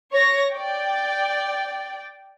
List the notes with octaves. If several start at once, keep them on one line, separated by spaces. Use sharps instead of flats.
C#5 C#6 A#6
D5 G5